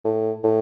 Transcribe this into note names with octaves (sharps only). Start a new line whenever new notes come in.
A2
A2